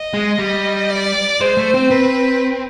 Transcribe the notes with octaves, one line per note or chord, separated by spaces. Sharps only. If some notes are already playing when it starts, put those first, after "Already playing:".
Already playing: D#5
G#3
G3
D5
G#3 C5
A3
C4
C4 B4